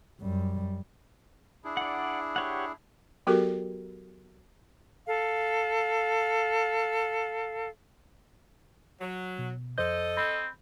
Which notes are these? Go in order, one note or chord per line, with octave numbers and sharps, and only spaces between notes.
F#2 G3
D4 E4 G#4
D5 F#5
G4 C#5 F#5
F#3 B3 F#4 G4 A4 A#4
A4 F5
F#3
B2
F2 A4 C5 D#5 G6
C4 B5